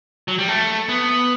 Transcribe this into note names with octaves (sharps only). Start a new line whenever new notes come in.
F#3
G3
A3
B3